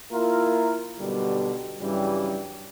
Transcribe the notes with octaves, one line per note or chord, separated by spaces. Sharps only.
A#3 E4 F4 A#4
B1 B2 D3 G3
G2 C#3 E3 F#3 G3